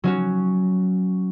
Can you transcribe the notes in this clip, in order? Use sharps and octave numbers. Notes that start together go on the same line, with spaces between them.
F#3 C#4 F#4